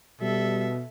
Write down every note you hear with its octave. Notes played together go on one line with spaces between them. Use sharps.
B2 G3 A4 E5